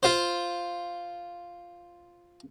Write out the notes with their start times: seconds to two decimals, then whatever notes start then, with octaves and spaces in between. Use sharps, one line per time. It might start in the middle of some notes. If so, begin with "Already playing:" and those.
0.03 F4 C5